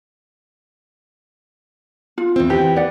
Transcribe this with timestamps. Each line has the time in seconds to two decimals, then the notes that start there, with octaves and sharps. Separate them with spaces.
2.18 F4
2.36 E2 G#2 C4
2.50 E3 G4
2.76 D5 F#5